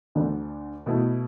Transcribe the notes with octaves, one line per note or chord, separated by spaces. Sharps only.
D2 D3 A3 D4
B2 A3 E4